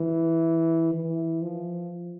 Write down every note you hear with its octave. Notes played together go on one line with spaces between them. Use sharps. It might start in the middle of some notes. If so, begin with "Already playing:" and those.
Already playing: E3
E3
F3